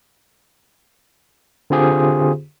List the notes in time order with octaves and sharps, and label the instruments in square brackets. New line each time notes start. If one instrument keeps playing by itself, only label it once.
[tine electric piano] D3 C4 F4 G4 G#4 C5